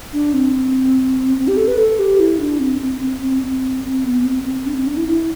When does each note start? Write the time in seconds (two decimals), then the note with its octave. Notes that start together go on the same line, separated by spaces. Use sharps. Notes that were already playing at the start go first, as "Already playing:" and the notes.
0.13 D4
0.33 C4
1.37 C4
1.48 G4
1.57 A4
1.68 B4
1.78 A4
1.99 G4
2.20 E4
2.40 D4
2.60 C4
2.81 C4
3.01 C4
3.21 C4
3.42 C4
3.84 C4
4.04 B3
4.24 C4
4.45 C4
4.66 D4
4.76 C4
4.87 D4
4.97 E4
5.08 E4